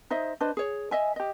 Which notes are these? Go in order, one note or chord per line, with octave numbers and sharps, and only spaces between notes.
D#4 C5 D#5 E5
D4 B4 C5 D#5
G#4 C#5
D#5 E5 G#5
G4 D#5